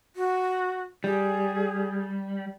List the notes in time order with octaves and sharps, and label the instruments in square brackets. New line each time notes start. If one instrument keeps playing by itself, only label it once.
[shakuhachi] F#4
[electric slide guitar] G3 [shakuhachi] G#4